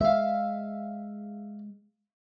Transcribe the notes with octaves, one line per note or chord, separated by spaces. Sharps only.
G#3 E5 F5